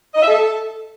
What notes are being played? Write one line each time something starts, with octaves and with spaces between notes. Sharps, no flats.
D#5
E5
A4